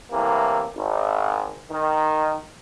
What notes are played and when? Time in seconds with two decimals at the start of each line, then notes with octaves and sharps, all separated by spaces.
0.12 A2 C3 E3 A#3
0.76 G#1
1.71 D#3